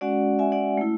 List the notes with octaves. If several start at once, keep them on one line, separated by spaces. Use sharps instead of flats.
G#3 C#4 F#4 D5 F#5
E5 G#5
D5 F#5
A3 E4